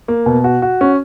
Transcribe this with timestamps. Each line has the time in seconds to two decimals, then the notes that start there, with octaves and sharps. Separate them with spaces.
0.08 A#3
0.26 B2
0.44 F#4
0.62 F#4
0.81 C#4